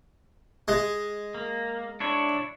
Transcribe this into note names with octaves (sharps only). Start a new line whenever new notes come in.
G#3
A#3
D4 E4 C#5